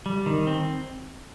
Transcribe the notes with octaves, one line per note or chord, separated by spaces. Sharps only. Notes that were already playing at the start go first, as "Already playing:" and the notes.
G3
D#3
C4